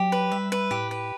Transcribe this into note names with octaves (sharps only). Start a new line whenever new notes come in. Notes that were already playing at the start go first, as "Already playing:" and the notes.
Already playing: F#3 G4
B4
G3 E5
B4
A2 G4
B4